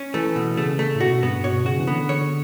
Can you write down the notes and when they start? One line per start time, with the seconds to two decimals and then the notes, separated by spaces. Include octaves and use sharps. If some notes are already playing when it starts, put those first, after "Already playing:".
Already playing: C#4
0.14 E3 A3
0.36 B2
0.57 C#3 A3
0.79 A3
0.95 A2
1.00 B2 F#4
1.23 G2 B3
1.44 B2 C#5
1.65 C#3 F#4
1.79 E3
1.87 D3 B3
2.09 C#5